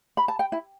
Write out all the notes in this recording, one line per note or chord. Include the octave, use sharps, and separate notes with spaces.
B5
A5
G5
E4